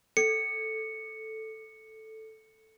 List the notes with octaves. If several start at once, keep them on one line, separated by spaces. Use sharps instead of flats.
A4 C#7